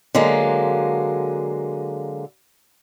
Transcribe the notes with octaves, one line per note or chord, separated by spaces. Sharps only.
D3 F#3 G#3 A#3